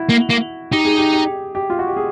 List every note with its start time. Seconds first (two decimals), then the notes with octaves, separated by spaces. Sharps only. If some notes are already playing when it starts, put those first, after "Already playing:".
Already playing: E4 F#4
0.09 A#3
0.29 A#3
0.72 D#4 G4
0.85 G#4
0.98 G4
1.13 G4
1.55 G4
1.70 F4
1.79 F#4
1.87 G4
1.97 G#4